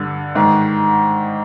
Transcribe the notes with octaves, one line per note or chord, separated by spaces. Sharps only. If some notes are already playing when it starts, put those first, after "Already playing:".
Already playing: G2 D3
G#2 D#3